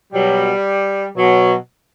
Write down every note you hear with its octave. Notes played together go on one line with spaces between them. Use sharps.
B2 F#3 G3
B2 F#3